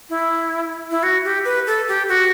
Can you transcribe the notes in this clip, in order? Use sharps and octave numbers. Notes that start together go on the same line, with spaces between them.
E4
E4
F#4
G4
B4
A4
G4
F#4